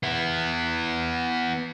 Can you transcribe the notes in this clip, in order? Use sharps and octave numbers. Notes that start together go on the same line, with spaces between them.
B3 E4